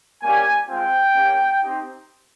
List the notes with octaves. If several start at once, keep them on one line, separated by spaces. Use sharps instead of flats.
G3 A#3 C#4 G4 G#5
G#3 C4 F4 G5
A#3 C#4 G4
C4 D#4 G4